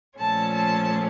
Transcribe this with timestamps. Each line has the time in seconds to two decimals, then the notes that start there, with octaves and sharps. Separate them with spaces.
0.18 A#2 F3 A3 C#4 A5
0.53 A5